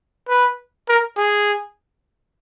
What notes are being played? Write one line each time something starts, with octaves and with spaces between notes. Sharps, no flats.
B4
A#4
G#4